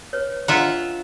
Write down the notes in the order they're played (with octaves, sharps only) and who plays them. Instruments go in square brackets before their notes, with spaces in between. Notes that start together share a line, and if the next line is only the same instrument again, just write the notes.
[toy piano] B4 C#5
[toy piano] D4 D#5 A#5 [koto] F4 E5 F#5